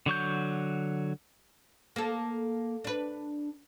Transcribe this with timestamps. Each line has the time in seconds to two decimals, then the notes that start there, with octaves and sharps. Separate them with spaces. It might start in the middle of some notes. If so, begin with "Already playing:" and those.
0.06 D3 F#3 C#6 G6
1.96 A#3 A4
2.84 D4 B4